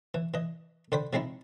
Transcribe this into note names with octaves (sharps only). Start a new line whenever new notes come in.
E3
E3 D#5
D3 C5 G5 B5
F3 G#3 C4 D#4 E4